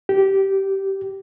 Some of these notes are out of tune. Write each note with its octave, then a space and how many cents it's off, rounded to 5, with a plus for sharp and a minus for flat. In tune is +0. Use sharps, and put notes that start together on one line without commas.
G4 -15